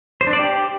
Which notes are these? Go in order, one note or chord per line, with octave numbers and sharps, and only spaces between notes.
C5
D4
D5
G4